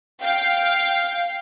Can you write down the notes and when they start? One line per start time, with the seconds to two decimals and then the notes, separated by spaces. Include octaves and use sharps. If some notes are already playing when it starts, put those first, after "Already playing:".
0.22 F5 G5